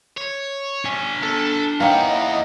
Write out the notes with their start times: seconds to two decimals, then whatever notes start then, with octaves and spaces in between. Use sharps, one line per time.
0.17 C#5
0.85 D4 G#5
1.23 A4
1.80 E3 A#3 C#4 D#4 F#5 G5
2.06 D#5